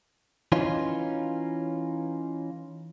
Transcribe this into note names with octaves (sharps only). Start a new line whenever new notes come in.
E3 C#4 D#4 F4